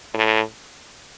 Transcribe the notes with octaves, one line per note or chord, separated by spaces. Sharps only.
A2